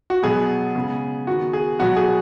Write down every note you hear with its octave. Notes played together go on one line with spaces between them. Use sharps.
F#4
B2 F#3 B3 G#4
C#3 G#3 B3
D#3 B3 F#4
G#4
B2 F#3 B3 F#4
G#4